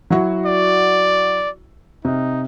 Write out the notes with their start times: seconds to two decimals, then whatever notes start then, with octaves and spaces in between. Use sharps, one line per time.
0.10 F#3 E4 F#4
0.46 D5
2.05 C3 D#4